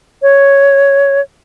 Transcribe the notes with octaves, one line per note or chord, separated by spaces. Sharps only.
C#5